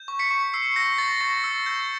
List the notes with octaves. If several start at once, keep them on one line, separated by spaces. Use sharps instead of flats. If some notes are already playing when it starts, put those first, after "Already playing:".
Already playing: G6
C#6
B6 C#7
C#6
E6 C7
G6 A#6
C#6 A6
C#6 A#6
E6
G6